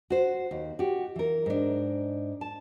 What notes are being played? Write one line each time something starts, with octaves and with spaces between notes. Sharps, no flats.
F#4 C5
D#2
F#4 G4
E3 A#4
G#2 D4
A5